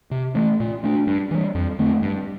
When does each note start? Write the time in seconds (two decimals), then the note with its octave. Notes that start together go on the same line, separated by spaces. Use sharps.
0.11 C3
0.35 E3 A3
0.60 A#2
0.84 A3 D4
1.07 G2
1.31 E3 G3
1.55 F2
1.79 D3 A3 C4
2.02 G2